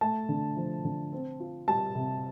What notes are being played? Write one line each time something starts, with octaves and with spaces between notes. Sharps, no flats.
A3 A5
D3
F3
D3
C4
F4
G3 A5
C3